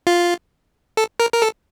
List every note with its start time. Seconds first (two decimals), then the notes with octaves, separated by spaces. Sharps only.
0.07 F4
0.97 A4
1.20 A#4
1.33 A#4
1.42 A4